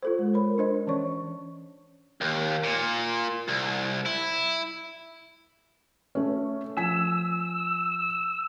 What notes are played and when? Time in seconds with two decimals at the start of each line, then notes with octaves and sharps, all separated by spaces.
0.03 F4 A4 C5
0.19 G#3
0.34 A#4 C#5 B5
0.58 D4 C5 D#5
0.87 E3 C#4 C#5 C#6
2.21 D#2
2.64 A#2
3.48 C2
4.06 E4
6.15 A3 C#4
6.77 F3 G#5 E6 B6